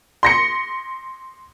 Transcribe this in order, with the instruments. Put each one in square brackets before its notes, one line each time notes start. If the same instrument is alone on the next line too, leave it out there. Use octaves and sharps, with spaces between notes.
[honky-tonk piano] C6 A#6 C#7